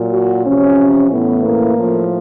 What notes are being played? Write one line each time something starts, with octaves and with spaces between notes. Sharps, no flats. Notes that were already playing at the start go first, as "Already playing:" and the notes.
Already playing: A#2 F#3
F#4
C3 F3 C#4
A2 E3 B3
A#3
A2 F3